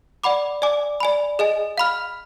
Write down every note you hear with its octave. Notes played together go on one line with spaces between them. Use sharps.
D5 F#5 B5 D6
D5 G#5 D6
D5 G#5 B5
G#4 D#5 G#5
F5 B5 F6